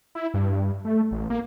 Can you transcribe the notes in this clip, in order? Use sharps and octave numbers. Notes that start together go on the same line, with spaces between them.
E4
G2
A3
A1
A#3